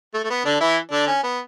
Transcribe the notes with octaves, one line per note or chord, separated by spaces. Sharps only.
A3
A3
B3
D3 D4
E3 E4
D3 D4
C#4
B3